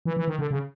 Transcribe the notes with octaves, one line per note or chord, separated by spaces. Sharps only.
E3
E3
D#3
D3
C#3